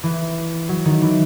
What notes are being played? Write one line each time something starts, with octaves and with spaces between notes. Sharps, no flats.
E3
F#3
D#3
E3